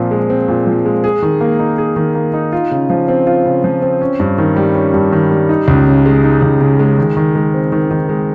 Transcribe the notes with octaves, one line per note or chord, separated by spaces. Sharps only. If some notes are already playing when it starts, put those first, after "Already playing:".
Already playing: A#2 F3 C4
G#3
C4
A#2
F3
G#3
G#4
D#3
A#3
D#4
G#4
D#3
A#3
D#4
F4
C#3
F3
C4
F4
C#3
F3
C4
C#4
G2
D#3
G3
C#4
G2
D#3
G3
D#4
C#2
C#3
G#3
D#4
C#2
C#3
G#3
D#3
D#3
G#3
C4
D#3
D#3
G#3